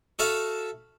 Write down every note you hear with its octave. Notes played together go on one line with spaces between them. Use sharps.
F#4 A4 E5 F5